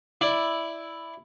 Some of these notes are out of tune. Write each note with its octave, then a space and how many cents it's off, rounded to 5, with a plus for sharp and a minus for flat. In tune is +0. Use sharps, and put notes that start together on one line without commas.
E4 +0 D5 +0